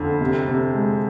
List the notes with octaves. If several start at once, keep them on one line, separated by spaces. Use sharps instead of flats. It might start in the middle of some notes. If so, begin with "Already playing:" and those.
Already playing: F2 D3
C3
C3
G#3